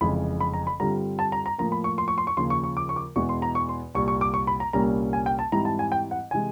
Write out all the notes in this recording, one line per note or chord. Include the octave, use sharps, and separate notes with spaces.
F1 F2 C#3 E3 G#3 B5
B5
A#5
B5
G2 D3 G3 C4 F4 A#5
A5
A#5
A#5
A2 F3 A#3 A#5
B5
C#6
C6
C#6
C6
C#6
D#2 C#3 F3 C6
C#6
C#6
D6
C#6
D6
E2 B2 G#3 B3 E4 C#6
C6
A#5
C#6
C6
C2 A#2 G3 C#6
C#6
D6
C#6
B5
A#5
C2 A#2 G3 A#3 C#4 A#5
G#5
G5
A5
G#2 E3 G3 C4 E4 A#5
A5
G#5
G5
F#5
C3 E3 G#3 G#5